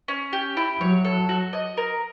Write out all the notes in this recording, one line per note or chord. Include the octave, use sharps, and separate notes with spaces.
C#4
G4
E4
F#3 C#5
A4
F#4
D#5
A#4